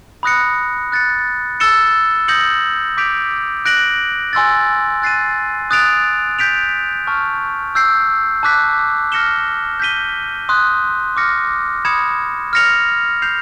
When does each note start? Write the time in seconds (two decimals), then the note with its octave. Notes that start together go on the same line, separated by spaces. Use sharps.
0.23 B5 D#6 F#6 A#6 C#7
0.92 F#6 A6 C#7
1.60 E6 A6 C#7 E7 G7
2.28 D#6 G6 A#6 C#7 F#7
2.97 D6 G6 B6 D7 F7
3.65 F#6 A#6 D7 F#7
4.33 G#5 C6 E6 A6
5.02 F#6 A6 C7 D#7
5.71 D#6 F#6 A6 D7 F7
6.39 G6 B6 D7 F7
7.07 A5 C#6 F6
7.75 E6 G6 C7
8.43 A5 D6 F#6 B6
9.12 F6 A#6 C#7 E7 G7
9.80 G6 B6 D#7 G7
10.49 C6 D#6 F#6
11.17 D6 F6 A#6 C#7
11.85 B5 D#6 G#6 C#7 E7
12.53 F6 A#6 C#7 F7
13.22 G6 C7 F7